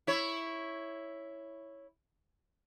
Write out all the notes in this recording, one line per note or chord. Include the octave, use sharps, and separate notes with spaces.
E4 C#5